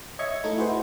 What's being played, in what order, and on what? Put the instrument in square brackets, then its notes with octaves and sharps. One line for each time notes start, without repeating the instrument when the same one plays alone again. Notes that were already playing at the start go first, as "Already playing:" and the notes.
[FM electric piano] C#5 D#5 E5 G#6 C#7
A3 D#4 E4
E4 F#4 G#4 B4 C5